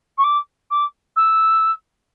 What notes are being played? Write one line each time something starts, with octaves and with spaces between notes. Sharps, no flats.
C#6
D6
D6
E6